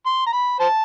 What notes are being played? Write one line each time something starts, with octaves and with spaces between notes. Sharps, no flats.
C6
A#5
B5
C5 A5